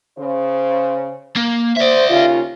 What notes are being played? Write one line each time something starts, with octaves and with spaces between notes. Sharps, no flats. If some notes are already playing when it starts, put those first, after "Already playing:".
C#3 C5
A#3
C5 D5 E5
D#2 C#3 F4